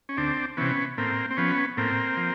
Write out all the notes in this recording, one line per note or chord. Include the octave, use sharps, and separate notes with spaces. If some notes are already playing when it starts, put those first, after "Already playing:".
C#4
D2 C4 D4
C3 E3 B3 C#4
A2 A#3 C4
C4
F3 B3 C#4
A2 A#3 C4
F3